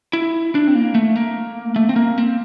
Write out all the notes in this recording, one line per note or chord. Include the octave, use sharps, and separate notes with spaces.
E4
D4
C4
A#3
A3
A#3
A3
C4
A#3
C4